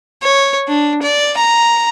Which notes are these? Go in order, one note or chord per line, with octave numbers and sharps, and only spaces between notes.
C#5
D4
D5
A#5